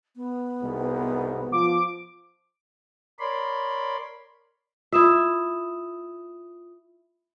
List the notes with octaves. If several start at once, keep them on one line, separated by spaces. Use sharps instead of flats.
B3
C2 G#2 B2
F3 D6
A#4 C#5 D5 B5 C6
E4 F4 E5 D#6 E7